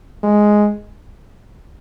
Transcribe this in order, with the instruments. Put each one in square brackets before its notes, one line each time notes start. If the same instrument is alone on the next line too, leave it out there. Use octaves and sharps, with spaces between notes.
[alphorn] G#3